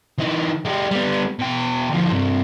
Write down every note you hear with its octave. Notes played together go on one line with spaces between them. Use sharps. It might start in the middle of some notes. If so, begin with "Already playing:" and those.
E3 D#4
G#3 G4
G3 B3
B2 G5
D2 F3
G2 C3